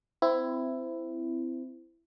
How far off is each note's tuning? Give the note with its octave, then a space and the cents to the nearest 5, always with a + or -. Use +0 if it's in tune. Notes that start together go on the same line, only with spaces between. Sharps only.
C4 -20 E4 +10